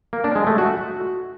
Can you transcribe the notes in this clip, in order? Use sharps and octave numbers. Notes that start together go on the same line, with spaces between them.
A#3
D4
G#3
A3
F#4